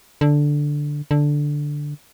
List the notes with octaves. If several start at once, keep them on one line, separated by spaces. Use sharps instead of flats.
D3
D3